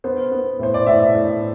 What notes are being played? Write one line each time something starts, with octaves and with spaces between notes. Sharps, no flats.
B3 C5
B3
A2 C5
D5
A2 E5
A2